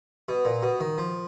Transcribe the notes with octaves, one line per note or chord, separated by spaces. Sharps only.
B2
A#2
B2
D#3
F3